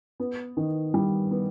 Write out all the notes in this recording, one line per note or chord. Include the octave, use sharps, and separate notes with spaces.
B3
D#3
G3
B3